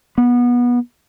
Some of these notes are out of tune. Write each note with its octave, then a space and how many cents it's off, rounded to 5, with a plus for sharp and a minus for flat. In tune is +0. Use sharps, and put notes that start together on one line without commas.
B3 -20